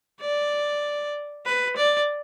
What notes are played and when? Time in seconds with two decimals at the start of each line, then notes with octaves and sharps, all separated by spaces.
0.21 D5
1.46 B4
1.77 D5